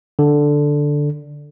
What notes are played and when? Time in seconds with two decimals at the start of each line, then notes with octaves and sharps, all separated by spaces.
0.19 D3